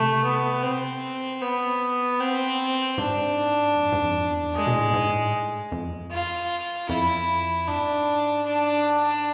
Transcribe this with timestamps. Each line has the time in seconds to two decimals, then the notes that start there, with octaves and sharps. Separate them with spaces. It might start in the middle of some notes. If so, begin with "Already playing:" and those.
Already playing: C3 A3
0.24 B3
0.63 C4
1.42 B3
2.20 C4
2.98 G#2 D4
3.76 F2
3.92 G#2
4.02 F2
4.28 E2
4.54 G#3
4.67 B2
4.74 A2
4.94 G#2
5.13 A2
5.72 F2
6.11 F4
6.89 F2 E4
7.67 G#2 D4
8.46 D4